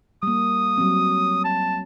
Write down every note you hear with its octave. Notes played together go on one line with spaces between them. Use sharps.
G3 A#3 D#6
F#3 G3 C4
A5